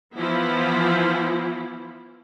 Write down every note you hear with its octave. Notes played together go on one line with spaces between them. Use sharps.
E3 F3 B3 E4